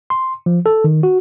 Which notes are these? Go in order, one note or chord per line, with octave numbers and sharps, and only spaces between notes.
C6
F3
A4
D#3
F#4